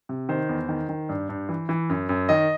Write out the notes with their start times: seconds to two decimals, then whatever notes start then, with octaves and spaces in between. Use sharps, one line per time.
0.09 C3
0.29 D#3 C5
0.49 E2
0.69 D#3
0.89 D#3
1.09 G2
1.29 G2
1.49 E3
1.69 E3
1.89 F#2
2.09 F#2
2.29 D#3 D#5